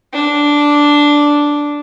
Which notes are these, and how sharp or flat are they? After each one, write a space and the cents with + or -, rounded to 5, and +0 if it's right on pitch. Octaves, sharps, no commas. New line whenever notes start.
D4 -5